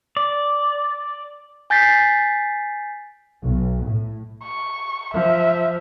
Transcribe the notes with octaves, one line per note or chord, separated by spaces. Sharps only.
D5
G#5 G6 A6 B6 C7
B1
A2
C#6
F3 E5